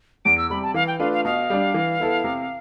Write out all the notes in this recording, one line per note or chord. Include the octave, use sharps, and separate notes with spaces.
E2 D7
E6
C3 G3 B5
A5
E3 F5
G5
A3 D4 F4 B4 F5
F5
B2 F5
G3 D4
E3
B3 E4 A4
C3